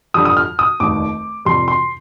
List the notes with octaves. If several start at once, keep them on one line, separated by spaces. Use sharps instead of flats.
F2 D3 G3 D#6
D#6
F6
D#6
F1 D#2 D#3 G3 D6
F2 C3 G3 C6
C6